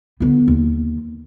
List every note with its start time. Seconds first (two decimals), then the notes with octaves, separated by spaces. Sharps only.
0.20 D3 B3
0.48 D#2